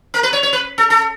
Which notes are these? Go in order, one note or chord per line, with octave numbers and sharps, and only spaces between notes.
A#4
B4
C#5
C#5
B4
A4
A4